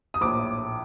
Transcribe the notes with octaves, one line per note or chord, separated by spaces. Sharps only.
D#6
A#1 A2 D6